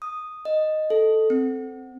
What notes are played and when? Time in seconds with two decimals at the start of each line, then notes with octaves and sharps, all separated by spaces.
0.02 D#6
0.45 D#5
0.90 A4
1.30 C4